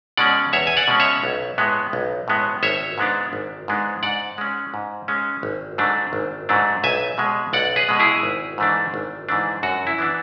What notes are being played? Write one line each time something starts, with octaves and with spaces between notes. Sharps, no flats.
B2 G#3 C#4 D5 F#5
E2 C#5 E5
G#5
D5 F#5
B2 G#3 C#4
C#5 E5
B1
A2 G#3 B3
B1
A2 G#3 B3
G#1 C#5 E5
G#2 G#3 B3 D4
G#1
G#2 G#3 B3 D4
G#2 D5 F#5
G#3 C#4
G#2
G#3 C#4
G#1
G#2 F#3 A3 D4
G#1
G#2 F#3 A3 D4
B1 E5 G#5
B2 G#3
B1 D5 F#5
G#4 B4
B2 G#3
E4 G#4
G#1
G#2 E3 A3 D4
G#1
G#2 E3 A3 D4
F#2 F#4
E4
E3 B3 D4